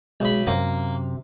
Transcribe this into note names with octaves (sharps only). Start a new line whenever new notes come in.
B1 G#3 B5
F#2 C3 A#3